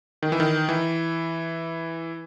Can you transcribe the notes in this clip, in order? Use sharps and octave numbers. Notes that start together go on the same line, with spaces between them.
D#3
E3
D#3
E3